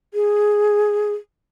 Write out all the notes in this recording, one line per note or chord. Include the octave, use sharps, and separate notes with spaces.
G#4